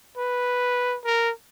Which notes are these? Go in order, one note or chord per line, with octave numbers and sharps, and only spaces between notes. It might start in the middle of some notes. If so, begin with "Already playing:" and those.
B4
A#4